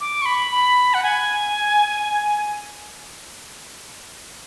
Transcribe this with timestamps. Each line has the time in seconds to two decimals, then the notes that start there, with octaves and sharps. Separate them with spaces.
0.01 D6
0.22 C#6
0.26 B5
0.51 B5
0.94 F#5
1.03 G#5